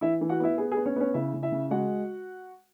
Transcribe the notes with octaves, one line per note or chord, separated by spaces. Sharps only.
E3 E4 E5
E3
F#4 F#5
B3 E4 E5
B3 G#4
G#4
B3
C#4 C#5
B3 C#4 C#5
C#3 E4 E5
C#3
E4 E5
C#3
G#3 F#4 F#5